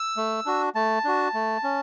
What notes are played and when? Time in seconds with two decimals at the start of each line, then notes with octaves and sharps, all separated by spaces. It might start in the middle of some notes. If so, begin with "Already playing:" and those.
Already playing: E6
0.17 A3
0.46 D4 F#4
0.75 A3 A5
1.05 D4 F#4
1.34 A3
1.64 C#4